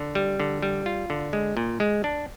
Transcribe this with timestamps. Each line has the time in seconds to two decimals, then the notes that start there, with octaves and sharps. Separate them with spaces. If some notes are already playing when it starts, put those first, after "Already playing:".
Already playing: D3
0.15 G3
0.40 D3
0.62 G3
0.86 F4
1.10 D3
1.33 G#3
1.57 A#2
1.80 G#3
2.04 D4